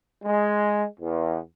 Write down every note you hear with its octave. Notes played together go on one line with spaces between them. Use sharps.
G#3
E2